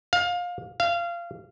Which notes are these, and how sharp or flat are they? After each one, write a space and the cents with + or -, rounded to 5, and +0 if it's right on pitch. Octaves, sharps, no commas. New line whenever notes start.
F5 +25
F5 -20